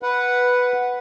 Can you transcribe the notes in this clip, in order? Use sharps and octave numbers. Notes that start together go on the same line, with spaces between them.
B4 F#5